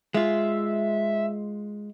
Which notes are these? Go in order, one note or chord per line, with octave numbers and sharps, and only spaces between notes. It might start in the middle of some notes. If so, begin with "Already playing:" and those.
G#3 F4 E5